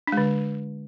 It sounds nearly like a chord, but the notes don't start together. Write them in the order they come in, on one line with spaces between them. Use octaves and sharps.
D4 G#3 D3